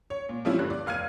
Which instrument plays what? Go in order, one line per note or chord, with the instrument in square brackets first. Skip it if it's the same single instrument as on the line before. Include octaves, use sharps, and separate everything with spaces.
[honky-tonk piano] C#5
A#2
F3 G3 C4 C#4 E4 F4
G2 D3 F#6
D5
F1 F5 F6 G#6 D#7